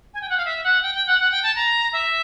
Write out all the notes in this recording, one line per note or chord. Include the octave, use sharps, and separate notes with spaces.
G#5
G5
F#5
F5
E5
F#5
G5
G5
F#5
F#5
G5
A5
A#5
E5